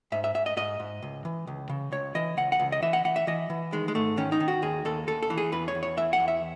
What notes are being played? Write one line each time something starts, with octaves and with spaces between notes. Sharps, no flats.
G#2 E5
E5
G#2 E5
D#5
G#2 D#5
G#2
C#2
E3
C#2
C#3
C#2 C#5
E3 D#5
C#2 F#5
F#5
C#2
D#5
E3 E5
F#5
E3 F#5
E5
E3 D#5
E3
D#3 G#3
G#3
G#2 A3
D#3 C#4
D#4
D#3
F#4
D#2 G#4
D#2 A4
D#2 A4
A4
E3
G#4
E2 B4
C#5
E2
C#5
E3 E5
F#5
E2
E5